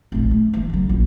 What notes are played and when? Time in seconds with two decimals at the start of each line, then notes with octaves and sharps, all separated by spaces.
0.12 F1 A#1
0.31 A3
0.54 E3 A#3
0.70 C#3 F#3
0.89 A#1